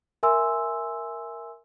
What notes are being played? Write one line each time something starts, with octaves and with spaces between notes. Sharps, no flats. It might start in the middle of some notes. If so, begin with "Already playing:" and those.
A#4 E5 G#5 C6 E6